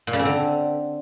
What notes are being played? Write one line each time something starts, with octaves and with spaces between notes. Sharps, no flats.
A#2
C#3
C4
D3